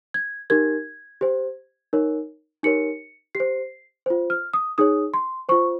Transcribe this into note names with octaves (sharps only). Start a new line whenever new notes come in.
G#6
D#4 G4 A#4 G#6
G4 C5
D#4 A#4 C#5
D#4 G4 A#4 C#5 C#7
G4 C7
C5
F4 C5
F6
D#6
D#4 G#4 C#5 D#6
C6
F4 C5 C#6